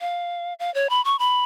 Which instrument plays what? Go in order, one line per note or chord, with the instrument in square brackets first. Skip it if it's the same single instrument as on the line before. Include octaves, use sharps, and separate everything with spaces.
[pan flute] F5
F5
C#5
B5
C#6
B5